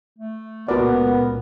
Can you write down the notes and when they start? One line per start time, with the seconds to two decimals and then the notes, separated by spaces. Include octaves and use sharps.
0.18 A3
0.68 C#2 A#2 B3 F#4 A#4 D5